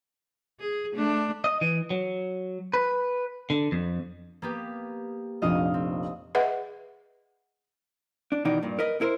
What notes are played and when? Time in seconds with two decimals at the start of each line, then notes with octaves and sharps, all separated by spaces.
0.60 G#4
0.94 A3 D4
1.44 D#5
1.61 E3
1.90 F#3
2.74 B4
3.50 D3
3.72 F2
4.42 A#3 B3 G4
5.42 F1 A#1 F2 D#5 F5 D#6
5.74 C4
6.35 G#4 B4 D#5 E5 F#5
8.32 D4
8.45 B2 D#3 E3 D#4 D5
8.63 G2 A#2
8.79 A#4 B4 D#5
9.01 E4 A#4 C5